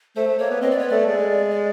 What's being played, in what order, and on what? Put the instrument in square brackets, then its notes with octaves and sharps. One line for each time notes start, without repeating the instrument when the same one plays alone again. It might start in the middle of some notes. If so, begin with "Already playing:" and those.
[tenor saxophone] A3 [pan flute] C5
[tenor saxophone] A3
[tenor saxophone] A#3 [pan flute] C#5
[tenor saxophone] B3
[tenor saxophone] C4 [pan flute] D#5
[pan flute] D5
[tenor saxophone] B3 [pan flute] C#5
[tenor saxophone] A3 [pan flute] D5
[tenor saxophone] G#3
[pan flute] D5